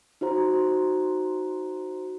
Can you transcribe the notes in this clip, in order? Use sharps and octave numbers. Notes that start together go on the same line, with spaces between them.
D#4 F#4 C5 A#5